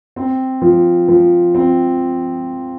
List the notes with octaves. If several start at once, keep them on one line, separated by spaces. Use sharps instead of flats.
C4
F3
F3
C4